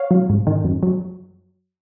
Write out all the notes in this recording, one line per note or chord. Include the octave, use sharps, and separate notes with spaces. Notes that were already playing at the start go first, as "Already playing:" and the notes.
Already playing: C#5 F5
F#3
G#2
D#3
F#2
F#3